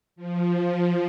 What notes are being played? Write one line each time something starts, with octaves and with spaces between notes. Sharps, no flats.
F3
F3